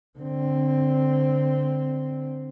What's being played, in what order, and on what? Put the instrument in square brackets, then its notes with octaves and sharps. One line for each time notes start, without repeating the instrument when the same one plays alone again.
[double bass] D3 C4